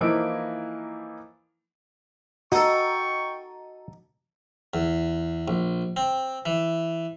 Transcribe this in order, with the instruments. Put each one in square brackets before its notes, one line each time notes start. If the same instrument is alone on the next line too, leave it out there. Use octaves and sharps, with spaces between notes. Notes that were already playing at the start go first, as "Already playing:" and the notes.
[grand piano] E3 F3 A#3 D#4 E4 D7
[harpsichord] D#4 A4 [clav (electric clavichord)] F#4 [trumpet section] G5 C#6
[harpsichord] E2
A#1
C4
E3